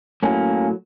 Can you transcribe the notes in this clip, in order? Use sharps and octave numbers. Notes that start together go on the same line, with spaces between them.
A2 F#3 A#3 C#4